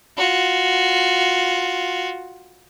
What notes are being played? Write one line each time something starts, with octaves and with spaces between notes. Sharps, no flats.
F4 F#4